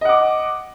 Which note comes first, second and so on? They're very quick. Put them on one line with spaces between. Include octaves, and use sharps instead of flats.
D#5 F#5 D6